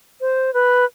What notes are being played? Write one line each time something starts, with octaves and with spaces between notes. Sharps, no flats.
C5
B4